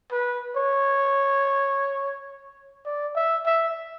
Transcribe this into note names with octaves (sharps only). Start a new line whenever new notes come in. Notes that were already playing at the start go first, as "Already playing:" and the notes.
B4
C#5
D5
E5
E5